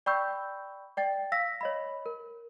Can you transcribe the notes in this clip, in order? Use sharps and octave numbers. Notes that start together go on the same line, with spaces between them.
D5 G5 B5 C#6 E6 G6
D5 G5 A6
F5 E6 A#6 B6
C#5 D#5 B5
A#4